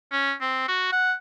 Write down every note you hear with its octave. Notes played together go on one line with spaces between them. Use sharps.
C#4
C4
F#4
F#5